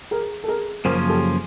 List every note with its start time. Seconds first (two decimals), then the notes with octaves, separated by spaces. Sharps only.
0.11 G#4 A#4
0.44 A4
0.48 G#4 A#4
0.85 F#2 C#3 F3 A#3 C#4 A#4 C5
1.10 G4 A4